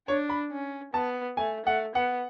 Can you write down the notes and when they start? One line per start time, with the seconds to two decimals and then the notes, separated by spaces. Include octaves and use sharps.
0.08 D4 C#5
0.29 B5
0.52 C#4
0.94 B3 A5
1.37 A3 G#5
1.65 A3 F#5
1.95 B3 F#5